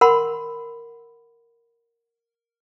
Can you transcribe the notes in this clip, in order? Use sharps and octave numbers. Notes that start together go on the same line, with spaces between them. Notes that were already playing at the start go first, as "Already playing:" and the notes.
A#4 F#5 B5 C6